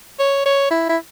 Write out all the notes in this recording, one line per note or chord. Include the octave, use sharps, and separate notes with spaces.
C#5
C#5
E4
E4